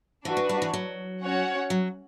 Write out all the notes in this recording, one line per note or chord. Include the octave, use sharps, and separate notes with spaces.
E3 D4 F#4 B4
E3
G3
E3
F#3
C#4 F#4 C#5 F#5
F#3